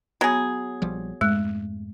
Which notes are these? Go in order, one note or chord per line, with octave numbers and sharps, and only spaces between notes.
F#3 B3 G#4
A#1 F3 G3
F2 G#2 G#3 A3 F#6